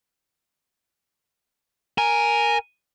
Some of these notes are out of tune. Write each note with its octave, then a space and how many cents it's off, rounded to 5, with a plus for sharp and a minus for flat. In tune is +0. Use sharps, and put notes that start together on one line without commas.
A#4 +0 G#5 +0